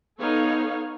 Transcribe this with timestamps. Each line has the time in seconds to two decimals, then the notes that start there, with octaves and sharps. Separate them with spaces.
0.19 B3 D#4 A4 C#5 F5